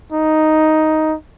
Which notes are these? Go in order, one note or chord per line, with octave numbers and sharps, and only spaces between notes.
D#4